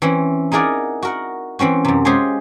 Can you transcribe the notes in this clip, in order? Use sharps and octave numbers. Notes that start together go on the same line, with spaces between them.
E3 C4 C#4 E4
D#4 E4 G#4 A#4 D5 F#5
F#4 A#4 F#5
E3 C4 C#4 F#4
F#2 C3
G#3 C#4 F4 G4 G#4 C5